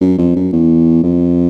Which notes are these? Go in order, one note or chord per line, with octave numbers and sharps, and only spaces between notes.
F#2
F2
F#2
E2
F2